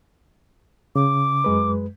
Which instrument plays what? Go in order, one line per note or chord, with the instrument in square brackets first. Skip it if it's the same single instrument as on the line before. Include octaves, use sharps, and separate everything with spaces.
[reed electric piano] C#3 [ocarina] D6
[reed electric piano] F#2 G#3 B4